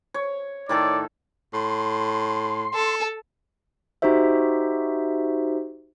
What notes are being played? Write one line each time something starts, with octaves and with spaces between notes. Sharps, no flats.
C#5
A2 D#3 A4 D5
A2 C6
A4
D#4 F#4 G4 C5 E5